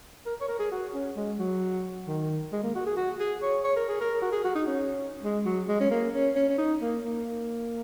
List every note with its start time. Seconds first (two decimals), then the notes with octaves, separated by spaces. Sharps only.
0.26 A#4
0.40 C#5
0.48 A#4
0.59 G#4
0.71 F#4
0.94 C#4
1.16 G#3
1.39 F#3
2.07 D#3
2.52 G#3
2.63 A#3
2.75 F#4
2.86 G#4
2.96 F#4
3.20 G#4
3.42 C#5
3.64 C#5
3.76 A#4
3.89 G#4
4.01 A#4
4.22 F#4
4.32 G#4
4.44 F#4
4.55 D#4
4.67 C#4
5.23 G#3
5.45 F#3
5.68 G#3
5.80 C#4
5.91 A#3
6.14 C#4
6.35 C#4
6.49 C#4
6.58 D#4
6.81 A#3
7.03 A#3